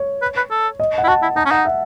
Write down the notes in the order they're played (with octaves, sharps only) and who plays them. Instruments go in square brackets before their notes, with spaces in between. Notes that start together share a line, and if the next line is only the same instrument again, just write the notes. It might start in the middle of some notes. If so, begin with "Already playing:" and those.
Already playing: [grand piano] C#5
[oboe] B4
B4
A4
[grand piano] D#5
F#5
[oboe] E4
[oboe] F#4 [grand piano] A5
[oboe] E4
[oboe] D#4 [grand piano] A5
[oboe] C#4
[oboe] D#4 [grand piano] F#5
[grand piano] E5